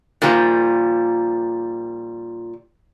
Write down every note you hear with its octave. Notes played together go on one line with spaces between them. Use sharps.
A#2 D#3 F3 G3